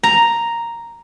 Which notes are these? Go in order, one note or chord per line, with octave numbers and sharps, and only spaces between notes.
A#5